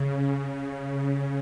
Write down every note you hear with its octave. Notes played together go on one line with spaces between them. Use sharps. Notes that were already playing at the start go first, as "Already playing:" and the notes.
Already playing: C#3
C#3